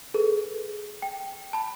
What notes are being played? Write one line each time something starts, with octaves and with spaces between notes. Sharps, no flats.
G#4 A4 B4
G5
A5 B5